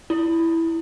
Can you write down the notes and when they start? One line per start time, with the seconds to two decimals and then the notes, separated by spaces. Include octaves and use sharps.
0.10 E4